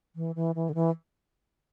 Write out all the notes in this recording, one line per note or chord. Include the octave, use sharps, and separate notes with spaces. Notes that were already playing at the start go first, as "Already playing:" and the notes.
E3
E3
E3
D3
E3